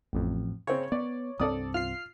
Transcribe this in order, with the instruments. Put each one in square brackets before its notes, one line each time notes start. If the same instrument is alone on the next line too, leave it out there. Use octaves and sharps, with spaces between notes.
[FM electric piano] A1 F2
[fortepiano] C#3 C4 [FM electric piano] C#5
[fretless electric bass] B3 [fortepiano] D5
[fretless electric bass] C2 G2 C4 [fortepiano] A4 D5 D#6
[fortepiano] F4 [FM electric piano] F6 C7